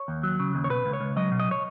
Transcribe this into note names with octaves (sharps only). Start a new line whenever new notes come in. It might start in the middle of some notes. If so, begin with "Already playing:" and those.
Already playing: C#5
D#2
F#3
C#3
D#2
C#5
B2 B4
C#2
C#5
C#2
F#3 D#5
B2
D#5
C#5